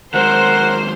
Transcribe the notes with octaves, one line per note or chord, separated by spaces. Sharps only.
D#3 F#3 G#3 A#4 C5 F#5